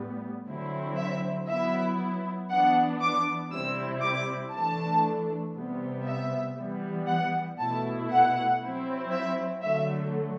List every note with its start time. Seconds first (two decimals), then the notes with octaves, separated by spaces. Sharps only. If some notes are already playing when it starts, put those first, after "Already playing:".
Already playing: A2 G3 B3
0.47 D3 F#3 C4 E4
0.98 E5
1.48 F#3 B3 E4 E5
2.50 E3 B3 D4 F#5
3.02 D6
3.52 C3 G3 C4 E4 E6
4.02 D6
4.53 E3 A3 D4 A5
5.55 C3 G3 B3
6.07 E5
6.57 E3 G3 B3
7.08 F#5
7.58 B2 A3 E4 A5
8.10 F#5
8.61 F#3 C4 E4
9.11 E5
9.62 D3 F#3 A3 E5